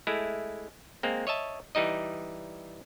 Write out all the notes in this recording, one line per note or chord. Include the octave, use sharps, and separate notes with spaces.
G#3 A3 E4
G#3 A#3 C4
C#5 D#5 E5 A5
E3 G3 D#4 D#5